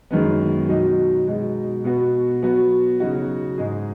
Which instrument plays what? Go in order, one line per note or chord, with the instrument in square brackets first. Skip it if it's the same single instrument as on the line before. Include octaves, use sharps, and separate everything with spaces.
[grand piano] F#2 D#3 G#3 B3
B2 F#3 D#4
B2 G#3 D#4
B2 B3 F#4
F#3 B3 F#4
C#3 F#3 D#4 F#4
G#2 G#3 D#4 G#4